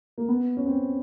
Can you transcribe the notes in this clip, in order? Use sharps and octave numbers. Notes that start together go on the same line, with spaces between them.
A#3
B3
C#4
C4